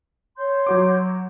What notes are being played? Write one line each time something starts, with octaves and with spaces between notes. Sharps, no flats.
C#5 C6 G6
F#3 F#4 D6